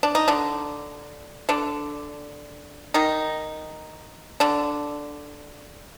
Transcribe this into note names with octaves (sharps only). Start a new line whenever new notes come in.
D4
D#4
D3 D4
D3 D4
D#3 D#4
D3 D4